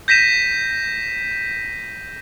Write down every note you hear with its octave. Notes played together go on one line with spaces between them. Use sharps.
G6 A#6 B6 D#7 E7